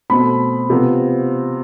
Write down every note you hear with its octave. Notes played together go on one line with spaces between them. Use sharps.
B2 A3 C4 B5
C3 F3 B3